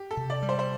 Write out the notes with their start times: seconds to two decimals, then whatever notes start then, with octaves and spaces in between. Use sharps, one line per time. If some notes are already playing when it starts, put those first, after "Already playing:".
Already playing: G4
0.11 A4
0.17 C3
0.30 D5
0.42 G3
0.49 C5
0.59 C5